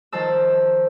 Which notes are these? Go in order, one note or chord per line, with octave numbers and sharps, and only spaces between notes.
D#3 F3 C5 A5 E6